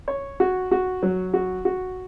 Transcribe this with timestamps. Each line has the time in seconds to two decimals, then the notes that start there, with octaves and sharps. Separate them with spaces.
0.08 C#5
0.40 F#4
0.71 F#4
1.03 F#3
1.34 F#4
1.65 F#4